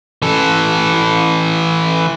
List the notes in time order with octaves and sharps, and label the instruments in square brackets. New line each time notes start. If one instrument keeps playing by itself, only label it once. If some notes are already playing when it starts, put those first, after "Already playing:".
[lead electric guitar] E3 A4